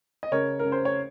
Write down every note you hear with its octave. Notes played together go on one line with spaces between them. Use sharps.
D#5
C#3 A#4 C#5
A#4
C#3
C5
C#5